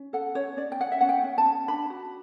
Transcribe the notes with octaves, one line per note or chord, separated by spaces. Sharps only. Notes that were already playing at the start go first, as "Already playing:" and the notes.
Already playing: C#4
A4 F#5
C#4 C#5
C#4 D5
G5
C#4 F#5
E5
C#4 F#5
G5
C#4
A5
C#4
D4 B5
F#4